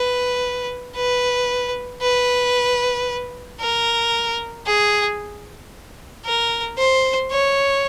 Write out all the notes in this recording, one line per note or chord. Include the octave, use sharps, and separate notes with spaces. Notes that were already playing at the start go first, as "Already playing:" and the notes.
Already playing: B4
B4
B4
A#4
G#4
A#4
C5
C#5